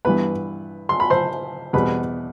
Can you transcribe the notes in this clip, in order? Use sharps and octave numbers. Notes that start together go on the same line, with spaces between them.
G2 E3 B3 B4 B5
C6
B5
C5 C6
E2 B2 G3 C4 B4 B5